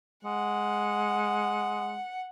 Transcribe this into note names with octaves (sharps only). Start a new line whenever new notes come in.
G#3 F#5